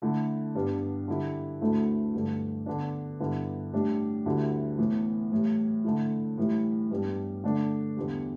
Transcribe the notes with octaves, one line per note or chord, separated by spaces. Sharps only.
D3 A3 E4
G2 G3 B3 D4
D3 G3 E4
D2 D3 A3 E4
G2 D3 A3 D4
D3 B3 D4
G2 D3 B3 E4
A2 G3 D4
D2 D3 G3 E4
A2 E3 B3
A2 E3 G3
D3 A3 E4
A2 E3 G3 E4
G2 G3 B3 D4
D3 A3 D4
E2 D3 G3